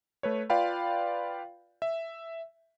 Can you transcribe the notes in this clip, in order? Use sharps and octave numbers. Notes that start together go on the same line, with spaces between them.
A3 B4 C#5
F4 B4 D5 F5 G5 B5
E5